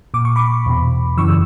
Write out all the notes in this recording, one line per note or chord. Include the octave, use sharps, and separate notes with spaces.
A#2 D6
C#6
B5 D6
E2 B2
F#2 C#3 E3 C#6 E6